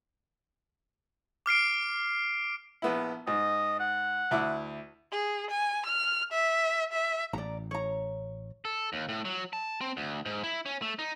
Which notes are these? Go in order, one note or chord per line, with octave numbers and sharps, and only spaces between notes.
D6 F6 C7 D7
A#1 B3 E4
G#2 D#5
F#5
D2 E4 D6
G#4
G#5
F6
E5
E5
A1 D5 A#5
C#5 A#5
A4
D#2
A2
F#3
A5
C4
D2
G#2
E4
C#4
A3
D#4